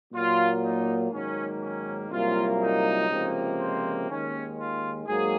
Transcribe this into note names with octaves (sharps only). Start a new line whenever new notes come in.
A#2 F#3 A#3 F4
D#4
G#2 D#3 F#3 A#3 C#4
C#4
C2 A#2 F#3 A#3 F4
D#4
C#2 C3 F3 A#3
C4
D#2 D#3 G#3 C#4
F4
G#2 F#3 A#3 G#4